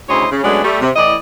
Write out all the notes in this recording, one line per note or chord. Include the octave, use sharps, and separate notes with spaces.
D2 C#3 E4 C5 C#5 D#5
C#3
F#3 G#3 A3 B3 C#4 D4
G3 A3
C3
A2 E3 E4 D5 D#5